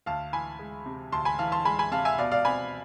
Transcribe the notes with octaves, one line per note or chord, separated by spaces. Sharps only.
D2 F5 A5
E3 G#5 B5
G#3
C3
D2 A5 C6
G#5 B5
E3 F5 A5
A5 C6
G#3 G#5 B5
G#5 B5
C3 F5 A5
E5 G#5
B2 D5 F5
D5 F5
C4 G#5 B5